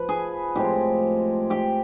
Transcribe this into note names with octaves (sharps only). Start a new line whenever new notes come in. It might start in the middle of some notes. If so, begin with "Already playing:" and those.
Already playing: F3 B4 B5
G#4 G#5
A2 F3 G#3 C4 G4 G5
G4 G5